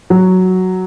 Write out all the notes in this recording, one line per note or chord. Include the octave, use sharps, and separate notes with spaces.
F#3